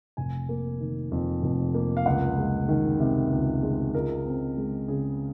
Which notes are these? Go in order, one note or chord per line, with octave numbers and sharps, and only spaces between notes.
F1 G#5
A#3
D#3
F2
F1
A#3
F5
C#2 F#5
G#3
D#3
C3
C#2
G#3
C#2 A#4
C4
G#3
C#3 G#4